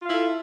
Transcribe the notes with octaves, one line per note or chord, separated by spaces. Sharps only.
E4 F4 A4 F5